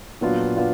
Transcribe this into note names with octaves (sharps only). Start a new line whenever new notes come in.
A#2 F#3 B3 D4 F4
B3 D4 F4